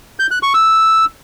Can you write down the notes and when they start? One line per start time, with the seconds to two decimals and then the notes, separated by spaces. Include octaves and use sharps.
0.19 G6
0.31 F#6
0.43 C#6
0.54 E6